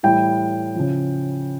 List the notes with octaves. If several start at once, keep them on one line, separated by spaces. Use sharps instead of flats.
A2 E3 G3 G5
C#3 F3